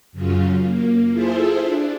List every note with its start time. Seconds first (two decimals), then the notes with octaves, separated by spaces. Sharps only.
0.12 F#2 C#3 F#3 C#4 F4
0.62 A#3
1.12 E4 F4 G#4 A4 C5 E5
1.63 D4